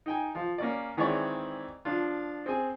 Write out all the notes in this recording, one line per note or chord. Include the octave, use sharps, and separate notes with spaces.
D#4 G5 G#5
F3 F4
A#3 C#4 D5
D#3 E3 G#3 C4 C#5 D5
F3 D4 F4
C4 G#4 G#5